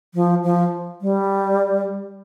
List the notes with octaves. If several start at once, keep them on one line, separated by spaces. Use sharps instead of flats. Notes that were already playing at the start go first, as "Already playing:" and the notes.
F3
F3
G3